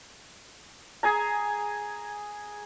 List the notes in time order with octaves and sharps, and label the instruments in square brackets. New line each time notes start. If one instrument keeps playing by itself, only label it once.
[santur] G#4 G#5 A#5